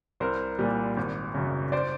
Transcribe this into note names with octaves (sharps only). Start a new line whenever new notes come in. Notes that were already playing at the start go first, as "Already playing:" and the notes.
C2 A#4 C5
A#2 G3
G#1
F#2 C#3
C5 D5